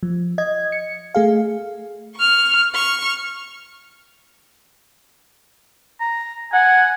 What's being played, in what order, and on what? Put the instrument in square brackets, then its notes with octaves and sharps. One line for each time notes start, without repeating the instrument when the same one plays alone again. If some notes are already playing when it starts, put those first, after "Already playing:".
[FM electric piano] F3
D#5 G#6
C#7
A3 G#4 F5
[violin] C#6 F6
C#6 F6
[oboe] A#5
[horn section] F#5 [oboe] G#5